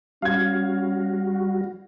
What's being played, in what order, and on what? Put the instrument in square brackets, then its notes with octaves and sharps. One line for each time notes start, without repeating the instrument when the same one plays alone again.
[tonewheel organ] G3 F#4 [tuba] C#4 [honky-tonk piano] F5 G#6